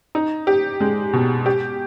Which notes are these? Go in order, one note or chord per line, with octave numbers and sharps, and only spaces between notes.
D#4
G4
G#3
B2
G4